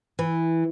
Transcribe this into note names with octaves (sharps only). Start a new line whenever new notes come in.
E3